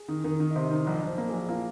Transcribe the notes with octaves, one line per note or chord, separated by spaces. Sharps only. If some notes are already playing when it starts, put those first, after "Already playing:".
Already playing: G#4
D#3
D#3 A#4
D#3
D#5
C3 C5
D#3
A#1 D#5
A#1 C5
A#3
A#1 G#4
A#3 F4